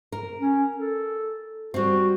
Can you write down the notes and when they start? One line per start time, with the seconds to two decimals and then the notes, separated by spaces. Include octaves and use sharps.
0.12 A#4
0.40 C#4
0.77 A4
1.74 G3 C4 F#4